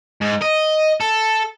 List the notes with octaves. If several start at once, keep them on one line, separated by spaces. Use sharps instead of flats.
G#2
D#5
A4